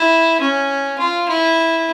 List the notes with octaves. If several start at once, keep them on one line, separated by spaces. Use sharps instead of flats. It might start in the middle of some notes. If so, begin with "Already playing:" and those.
Already playing: E4
C#4
F4
E4